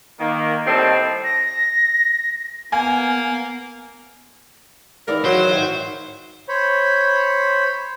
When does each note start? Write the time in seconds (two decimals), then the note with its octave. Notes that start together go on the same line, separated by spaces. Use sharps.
0.19 D#3 A#3
0.65 A2 G3 C4 A4 D#5
1.24 A#6
2.72 A#3 B3 G#5
5.08 D#2 E3 A#4 D5
5.25 F#3 C5
5.52 G#2 D#3 C#5 E5
6.49 C5 C#5 B5